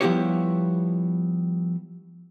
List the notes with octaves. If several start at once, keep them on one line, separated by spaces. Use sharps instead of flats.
F3 G3 B3 E4 G4 C#5